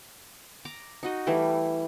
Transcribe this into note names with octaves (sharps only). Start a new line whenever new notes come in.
A#5 D6
D#4 F#4 D#5
E3 G3 A3 E4